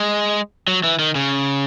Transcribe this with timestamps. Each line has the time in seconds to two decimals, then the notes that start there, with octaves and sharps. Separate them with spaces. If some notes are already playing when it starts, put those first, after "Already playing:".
Already playing: G#3
0.68 F#3
0.84 E3
0.99 D#3
1.15 C#3